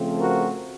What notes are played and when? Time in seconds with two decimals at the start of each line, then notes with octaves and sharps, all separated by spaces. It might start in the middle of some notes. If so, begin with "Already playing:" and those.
Already playing: C#3 F3 A3 C4
0.19 F#4 A#4